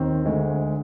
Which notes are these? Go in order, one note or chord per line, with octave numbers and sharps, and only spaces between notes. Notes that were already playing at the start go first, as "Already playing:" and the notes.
Already playing: D#2 D#3 C4
D2 D3 G#3